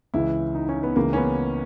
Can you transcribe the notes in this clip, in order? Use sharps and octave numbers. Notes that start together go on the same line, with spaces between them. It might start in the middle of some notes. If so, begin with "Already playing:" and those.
C#2 C#3 E3 E4
D#4
C#4
B3
C#2 C#3 E3 A#3
C#4
B3